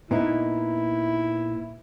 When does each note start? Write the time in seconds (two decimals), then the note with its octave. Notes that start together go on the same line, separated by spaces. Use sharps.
0.11 A#2 B3 D#4 E4